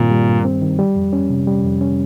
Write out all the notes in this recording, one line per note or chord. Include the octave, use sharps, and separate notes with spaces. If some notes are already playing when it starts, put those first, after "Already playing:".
Already playing: G2 A#2 D#3 G3 C4
G3
G2
C4
D#3
G3
F2
C#4
C3
G3
F2
C#4